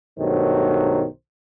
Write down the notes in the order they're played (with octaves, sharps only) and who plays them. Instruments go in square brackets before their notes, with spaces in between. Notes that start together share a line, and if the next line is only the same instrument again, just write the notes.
[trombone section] B1 G2 D#3 F#3 A3 C5